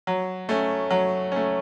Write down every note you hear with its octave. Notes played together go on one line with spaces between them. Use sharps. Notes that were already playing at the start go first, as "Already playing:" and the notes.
F#3
A3 C#4
F#3
A3 C#4